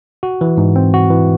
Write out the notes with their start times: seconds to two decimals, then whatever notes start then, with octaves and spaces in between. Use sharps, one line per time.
0.23 F#4
0.41 E3
0.57 G#2
0.76 C4
0.94 F#4
1.10 E3